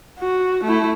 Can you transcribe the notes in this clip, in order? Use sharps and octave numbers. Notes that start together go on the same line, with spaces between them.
F#4
A3 E4